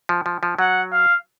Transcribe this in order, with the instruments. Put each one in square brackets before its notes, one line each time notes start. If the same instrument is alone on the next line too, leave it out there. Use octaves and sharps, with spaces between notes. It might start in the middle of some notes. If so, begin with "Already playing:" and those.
[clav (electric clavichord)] F3
F3
F3
[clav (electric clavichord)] F#3 [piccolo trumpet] F#5
[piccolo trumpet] F5